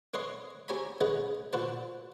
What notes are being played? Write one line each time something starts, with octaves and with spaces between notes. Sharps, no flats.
C4 B4 C#5 D#5 C6
C4 G4 C#5 G#5 A#5 B5
G#3 B3 C#4 G#4 B4 D#5
A#2 F#4 B4 C5 A5